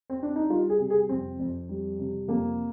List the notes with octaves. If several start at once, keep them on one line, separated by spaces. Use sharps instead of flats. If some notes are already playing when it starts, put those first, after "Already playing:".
C4
D4
D#4
G3 F4
G#4
C3
G#4
F2 C4
F2
G3
C3
F2 A#3